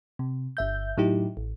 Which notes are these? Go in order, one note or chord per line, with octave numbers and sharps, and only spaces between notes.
C3
G1 E5 G6
A2 F#3 D#4 E4 G4
A1